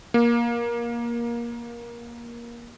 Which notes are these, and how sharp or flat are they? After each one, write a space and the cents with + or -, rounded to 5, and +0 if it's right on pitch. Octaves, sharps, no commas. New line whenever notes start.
A#3 +20